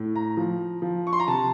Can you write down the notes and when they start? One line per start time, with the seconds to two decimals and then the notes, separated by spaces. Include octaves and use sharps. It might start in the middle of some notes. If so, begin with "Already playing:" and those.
Already playing: A2
0.16 A#5
0.37 F3
0.82 F3
1.07 C#6
1.13 C6
1.20 A#5
1.27 C3 A5